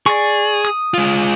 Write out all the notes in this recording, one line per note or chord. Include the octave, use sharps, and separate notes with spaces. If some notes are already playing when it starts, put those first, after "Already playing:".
G#4 D5 C#6
D#6
G#3 F4